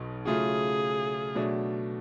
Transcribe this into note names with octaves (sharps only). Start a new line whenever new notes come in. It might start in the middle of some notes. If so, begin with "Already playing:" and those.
Already playing: B1 B2 F#3
C#3 F#3 A3 F4 G#4
B2 F#3 A3 D4